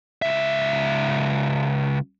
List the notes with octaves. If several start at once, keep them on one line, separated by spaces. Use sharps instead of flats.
C#2 E5